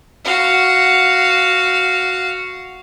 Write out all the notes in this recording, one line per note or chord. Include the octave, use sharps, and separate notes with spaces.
F#4 F5